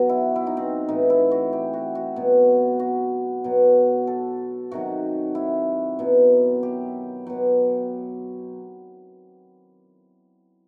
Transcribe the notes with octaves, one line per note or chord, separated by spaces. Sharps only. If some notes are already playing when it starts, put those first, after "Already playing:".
Already playing: B2 F#3 F#4
E4
E4
D#4
C4
A2 E3 D#4
E4
F#4
G4
F#4
F#4
B2 F#3
F#4
B2 F#3
A4
C3 D#3 F#3 F#4
E4
B2 F#3
G4
B2 F#3